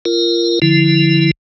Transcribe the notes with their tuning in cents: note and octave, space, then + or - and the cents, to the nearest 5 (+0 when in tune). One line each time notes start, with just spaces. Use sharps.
F4 -30 A#4 +0
D3 -5 F3 -10 E4 +0